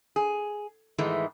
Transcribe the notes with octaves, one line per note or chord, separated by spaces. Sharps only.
G#4
G#2 D#3 E3 G#3 A3